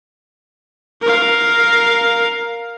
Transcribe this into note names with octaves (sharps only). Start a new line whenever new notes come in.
A#4 F5